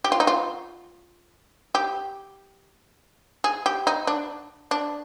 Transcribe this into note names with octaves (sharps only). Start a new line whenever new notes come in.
G4
F4
D#4
F4
G4
G#4
G4
D#4
D4
D4